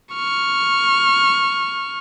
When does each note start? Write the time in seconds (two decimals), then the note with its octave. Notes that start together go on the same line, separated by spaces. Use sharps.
0.14 C#6 F6